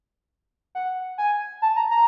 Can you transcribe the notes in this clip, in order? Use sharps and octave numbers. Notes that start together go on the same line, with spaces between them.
F#5
G#5
A5
A#5
A#5